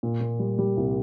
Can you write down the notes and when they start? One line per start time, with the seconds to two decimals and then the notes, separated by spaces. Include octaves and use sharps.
0.03 A#2
0.21 A#2
0.39 G3
0.59 G3
0.77 C2